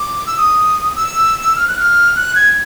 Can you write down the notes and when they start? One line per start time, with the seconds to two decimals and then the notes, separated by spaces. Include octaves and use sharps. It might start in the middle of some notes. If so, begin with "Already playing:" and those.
Already playing: D6
0.27 E6
0.37 D#6
0.93 D#6
0.96 E6
1.56 F6
1.68 F#6
1.79 F6
2.16 F#6
2.35 G#6